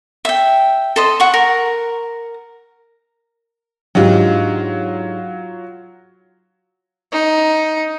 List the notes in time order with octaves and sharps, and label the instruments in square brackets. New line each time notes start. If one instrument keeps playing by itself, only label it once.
[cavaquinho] E5 G5
A4 C5 D#5
F#5 C#6
A#4
[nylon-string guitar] G#2 D4 G4 [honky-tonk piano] F#3 F4
[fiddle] D#4